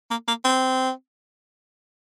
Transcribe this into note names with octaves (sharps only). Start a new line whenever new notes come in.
A#3
A#3
C4